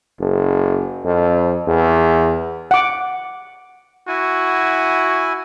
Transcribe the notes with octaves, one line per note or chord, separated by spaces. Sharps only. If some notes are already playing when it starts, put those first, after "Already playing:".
F#1
F2
E2
F#5 D6
E4 F#4 G#5